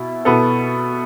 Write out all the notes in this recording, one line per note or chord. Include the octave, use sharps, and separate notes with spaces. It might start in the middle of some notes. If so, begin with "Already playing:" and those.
Already playing: B2 B3 E4
B2 B3 E4 A4